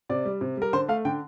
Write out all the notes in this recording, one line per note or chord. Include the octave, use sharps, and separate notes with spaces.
C3 D5
G3
C3
G3 A#4
D3 C5
A3 F5
D3 G5